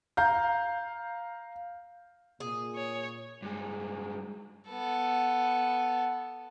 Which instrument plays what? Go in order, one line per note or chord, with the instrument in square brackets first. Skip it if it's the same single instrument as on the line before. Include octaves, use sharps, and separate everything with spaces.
[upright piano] F5 A#5 G6
[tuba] A#2 [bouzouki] G#4
[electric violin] C#5
[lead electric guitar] G2 G#3
[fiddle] B3 A4